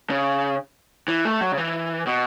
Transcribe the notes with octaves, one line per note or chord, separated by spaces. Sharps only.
C#3
E3
A3
F#3
C#3
E3
B2